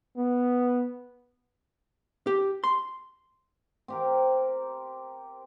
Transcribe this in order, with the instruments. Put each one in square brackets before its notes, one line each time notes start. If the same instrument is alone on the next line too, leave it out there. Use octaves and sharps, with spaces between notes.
[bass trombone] B3
[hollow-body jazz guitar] G4
C6
[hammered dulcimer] C4 G4 A#4